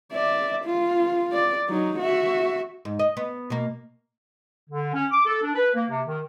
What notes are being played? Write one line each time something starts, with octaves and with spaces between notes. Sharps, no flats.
D5 E5
F4
D5
F#3 D#4
F#4 E5
G#2
D#5
B3
B2 A#3
D3
C#4
D6
A4
D4
B4
A#3
C3
D#3